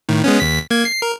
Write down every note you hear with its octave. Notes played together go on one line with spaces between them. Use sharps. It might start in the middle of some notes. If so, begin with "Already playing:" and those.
A2 D#3
G#3 B3 C#4
D#2 B6
A#3 G#6
C7
A#4